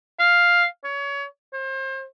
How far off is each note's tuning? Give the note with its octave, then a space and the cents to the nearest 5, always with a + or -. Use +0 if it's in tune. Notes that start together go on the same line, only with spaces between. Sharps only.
F5 +5
C#5 +25
C5 +35